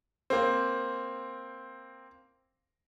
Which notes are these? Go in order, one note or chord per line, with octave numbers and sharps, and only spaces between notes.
A#3 C4